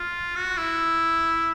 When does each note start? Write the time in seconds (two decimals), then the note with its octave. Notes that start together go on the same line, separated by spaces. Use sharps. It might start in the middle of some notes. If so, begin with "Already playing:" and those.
Already playing: F4
0.36 F#4
0.57 E4